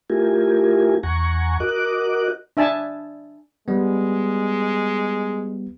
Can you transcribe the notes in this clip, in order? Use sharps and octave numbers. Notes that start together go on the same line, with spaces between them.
A3 E4 F4 G4 A#4 G#5
E2 F#5 G#5 A#5 C#6
F#4 A#4 D#5 D6 F#6
D4 E5 G#5 A5
G3 G#3 B3